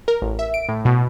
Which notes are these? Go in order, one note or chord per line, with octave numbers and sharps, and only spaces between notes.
A#4
A1
E5
D7
A2
B2